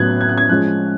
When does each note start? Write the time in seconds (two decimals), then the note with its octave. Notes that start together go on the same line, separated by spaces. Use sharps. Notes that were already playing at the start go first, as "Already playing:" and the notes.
Already playing: A2 F#3 B3 F#6 G#6
0.21 G#6
0.29 F#6
0.38 G#6
0.49 F3 G#3 C#4 F#6